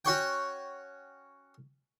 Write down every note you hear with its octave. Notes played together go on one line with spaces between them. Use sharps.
C#4 F#4 C#5 G5